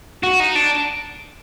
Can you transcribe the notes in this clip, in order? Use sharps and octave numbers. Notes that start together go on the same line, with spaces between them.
F#4
D#4
D4